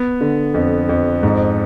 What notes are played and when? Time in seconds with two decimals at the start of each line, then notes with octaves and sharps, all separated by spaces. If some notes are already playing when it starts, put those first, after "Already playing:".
Already playing: B3
0.21 D3
0.54 F2
0.89 F2
1.23 G#2